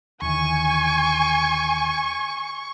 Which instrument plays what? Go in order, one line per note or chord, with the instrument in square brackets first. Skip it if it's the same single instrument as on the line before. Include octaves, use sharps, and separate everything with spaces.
[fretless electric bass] D#2 D3 E3 [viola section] G#5 [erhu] C#6